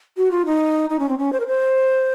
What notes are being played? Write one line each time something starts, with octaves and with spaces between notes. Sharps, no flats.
F#4
F4
D#4
D#4
C#4
C4
C#4
C5
A#4
C5